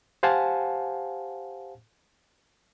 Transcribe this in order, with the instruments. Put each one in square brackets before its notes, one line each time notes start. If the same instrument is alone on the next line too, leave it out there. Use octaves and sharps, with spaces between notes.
[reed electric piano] G4 C5 F5 F#5 G#5 A5